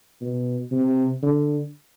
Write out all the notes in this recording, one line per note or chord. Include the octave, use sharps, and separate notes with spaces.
B2
C3
D3